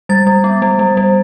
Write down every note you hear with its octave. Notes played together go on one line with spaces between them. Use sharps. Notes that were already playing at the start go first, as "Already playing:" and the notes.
G3 A6
G3
B3
G3
G3
G3